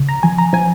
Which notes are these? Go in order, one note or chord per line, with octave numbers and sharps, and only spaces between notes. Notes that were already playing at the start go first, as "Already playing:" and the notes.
Already playing: C#3
A#5
F2 G#5
A#5
F3 G#5